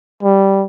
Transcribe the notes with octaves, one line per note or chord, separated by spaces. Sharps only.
G3